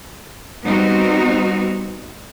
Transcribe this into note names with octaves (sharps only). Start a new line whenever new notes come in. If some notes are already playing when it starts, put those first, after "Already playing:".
G3 B3 C4 D#4 F#4